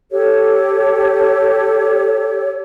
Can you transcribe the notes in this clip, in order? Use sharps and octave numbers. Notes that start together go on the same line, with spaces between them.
G4 A4 C#5